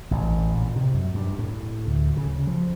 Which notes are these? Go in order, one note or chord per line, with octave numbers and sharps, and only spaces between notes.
A1
A#2
C3
F#2
G2
A2
D2
C#3
F3